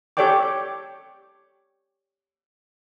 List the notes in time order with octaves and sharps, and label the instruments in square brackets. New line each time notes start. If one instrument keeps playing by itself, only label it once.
[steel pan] G4 A4 C#5 D5 G5 D6